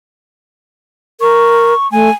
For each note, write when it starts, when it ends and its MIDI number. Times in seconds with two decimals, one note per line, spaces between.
1.21 1.74 70
1.21 1.90 85
1.92 2.10 57
1.92 2.12 80